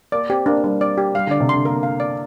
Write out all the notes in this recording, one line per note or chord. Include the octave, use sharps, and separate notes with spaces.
A#3 D5
C4 G4
A#3 D4
G3 D4
D5
G4
G3 F5
D3
D5
C3
D3 C6
A#3 A#4
F5
D5